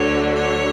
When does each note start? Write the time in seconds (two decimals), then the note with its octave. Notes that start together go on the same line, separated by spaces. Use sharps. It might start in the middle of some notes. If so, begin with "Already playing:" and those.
Already playing: D2 D3 F#3 C#5
0.35 C#5